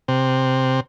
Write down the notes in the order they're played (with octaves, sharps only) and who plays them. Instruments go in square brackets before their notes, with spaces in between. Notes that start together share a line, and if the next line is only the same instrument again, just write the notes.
[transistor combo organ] C3